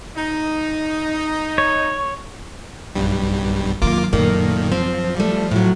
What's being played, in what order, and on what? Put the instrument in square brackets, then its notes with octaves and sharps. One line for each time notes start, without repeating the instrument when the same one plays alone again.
[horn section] D#4
[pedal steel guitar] C#5
[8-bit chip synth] B1 G2 G3
[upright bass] F#2 D#3 [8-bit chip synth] A#3 F4 D6
[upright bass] F#2 [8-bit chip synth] A#2 D#3 [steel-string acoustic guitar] A3 A#3
[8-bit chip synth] F3 [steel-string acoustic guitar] C4
[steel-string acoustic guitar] G3 A3
A2 F#3